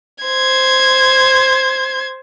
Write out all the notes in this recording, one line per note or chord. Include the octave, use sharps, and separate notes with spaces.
C5 G#6